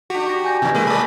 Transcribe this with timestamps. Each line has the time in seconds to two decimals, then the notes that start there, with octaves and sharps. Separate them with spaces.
0.10 D4 F#4 G4
0.27 C#6 A#6
0.45 G#5 G6 A#6
0.62 A2 C3 E3
0.75 G#3 A#3 E4 B4
0.87 G#3 A3 D5 B5